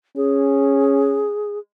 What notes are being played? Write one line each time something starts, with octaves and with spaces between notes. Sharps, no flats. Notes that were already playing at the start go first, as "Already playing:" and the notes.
C#4 G#4